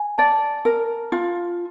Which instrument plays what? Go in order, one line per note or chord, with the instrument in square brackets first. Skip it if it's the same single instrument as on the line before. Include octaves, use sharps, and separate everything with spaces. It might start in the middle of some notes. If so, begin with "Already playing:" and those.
Already playing: [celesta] G#5
[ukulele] D5 [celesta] A5
[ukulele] A#4
F4